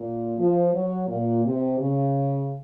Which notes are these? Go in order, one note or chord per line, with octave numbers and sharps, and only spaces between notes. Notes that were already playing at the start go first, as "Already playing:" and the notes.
Already playing: A#2
F3
F#3
A#2
C3
C#3